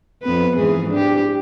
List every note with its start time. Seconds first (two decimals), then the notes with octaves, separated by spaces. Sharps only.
0.23 F2 B3 B4
0.56 G#2 E3 G#4
0.90 D4 G4